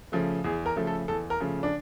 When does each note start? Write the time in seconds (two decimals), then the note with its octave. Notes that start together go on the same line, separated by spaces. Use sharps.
0.12 C#3 F3 A3
0.44 E2 G#4
0.66 A#4
0.76 C#3 F3 A3
0.87 A4
1.08 E2 A4
1.30 A#4
1.40 C#3 F3 A3
1.63 D4